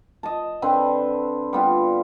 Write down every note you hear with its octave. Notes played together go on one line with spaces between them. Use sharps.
D#5 A5
D3 C4 B4
G3 B3 F4